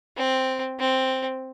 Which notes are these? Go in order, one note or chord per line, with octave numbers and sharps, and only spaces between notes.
C4
C4